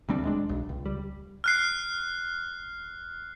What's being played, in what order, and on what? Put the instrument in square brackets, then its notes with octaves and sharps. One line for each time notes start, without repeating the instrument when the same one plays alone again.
[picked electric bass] D2 G3 C4 D4
D#1 G#3 D4
B1
C#2
G3
[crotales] F6 F#6 C7